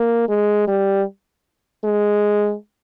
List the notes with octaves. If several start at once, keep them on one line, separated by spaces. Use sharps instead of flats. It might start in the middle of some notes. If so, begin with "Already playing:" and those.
Already playing: A#3
G#3
G3
G#3